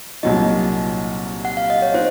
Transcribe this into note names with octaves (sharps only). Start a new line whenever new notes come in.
C2 A#2 F#3 A#3 D#4 D#5
F#5
F5
D#5
C#5
D#4 C5